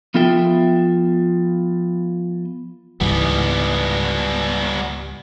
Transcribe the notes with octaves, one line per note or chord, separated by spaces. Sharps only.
F3 B3 F4 A4 E5 G5
C#2 G#2 E3 G3 B3